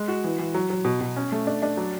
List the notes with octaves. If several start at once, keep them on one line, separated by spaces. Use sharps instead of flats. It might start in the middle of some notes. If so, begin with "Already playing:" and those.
Already playing: G#3
F#4
E3
E3
F#3
F#3
B2
B2
C#4
A3
D4
D4
F#3